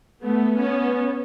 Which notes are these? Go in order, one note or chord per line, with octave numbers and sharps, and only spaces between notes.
A3 B3
B3 C#4